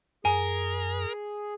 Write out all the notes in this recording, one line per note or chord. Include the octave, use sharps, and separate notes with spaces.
F#2 G#4 A#4 G#5